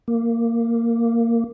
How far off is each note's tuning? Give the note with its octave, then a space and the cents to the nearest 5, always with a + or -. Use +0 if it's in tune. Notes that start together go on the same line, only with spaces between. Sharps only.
A#3 -10